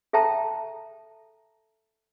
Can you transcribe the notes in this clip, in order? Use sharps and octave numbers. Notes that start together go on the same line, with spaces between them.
A4 E5 G5 A5 A#5